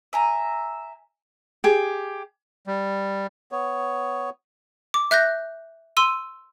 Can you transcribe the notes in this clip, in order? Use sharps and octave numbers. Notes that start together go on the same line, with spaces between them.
E5 G#5 A#5
G4 G#4
G3
B3 C#5
D6
E5 F#6 G6 A#6
C6 E6 D#7